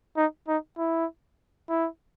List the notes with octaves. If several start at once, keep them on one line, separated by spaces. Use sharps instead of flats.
D#4
D#4
E4
E4